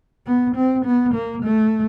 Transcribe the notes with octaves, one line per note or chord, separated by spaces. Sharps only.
B3
C4
B3
A#3
A3